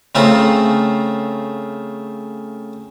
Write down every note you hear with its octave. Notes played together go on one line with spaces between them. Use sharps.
C#3 A3 C4 F4 A#4